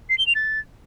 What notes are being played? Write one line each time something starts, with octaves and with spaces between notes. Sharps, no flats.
C7
G7
F7
A6